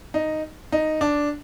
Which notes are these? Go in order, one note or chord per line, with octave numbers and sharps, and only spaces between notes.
D#4
D#4
D4